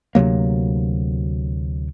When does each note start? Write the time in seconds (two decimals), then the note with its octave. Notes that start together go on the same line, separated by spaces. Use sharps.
0.15 D2 C3 F#3 A#3